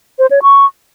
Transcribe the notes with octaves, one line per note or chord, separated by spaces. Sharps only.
C5
C#5
C#6